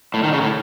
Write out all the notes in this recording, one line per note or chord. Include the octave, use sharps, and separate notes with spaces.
A2
D#3
C#3
A2